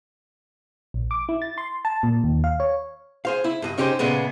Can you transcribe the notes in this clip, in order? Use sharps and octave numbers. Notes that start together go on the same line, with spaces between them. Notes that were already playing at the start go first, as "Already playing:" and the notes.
A#1
D6
E4
A6
C6
A5
A#2
D#2
F5
C#5
G#4 C5 F5
E4
G2 G#4 D#5
C#4 D#4 G4 G#4 C5
A#2 C#3 G#3 A3 B3